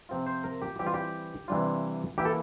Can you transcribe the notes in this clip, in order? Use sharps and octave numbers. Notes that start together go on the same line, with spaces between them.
C3 F3 C4 F4
C5
A#4
G4
E3 G3 C4 E4 G4
F4
G4
C3 E3 G3 D4 F4
E3 A#3 E4 G4
A4